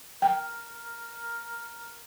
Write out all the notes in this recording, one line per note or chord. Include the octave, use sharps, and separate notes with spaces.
A#4 G5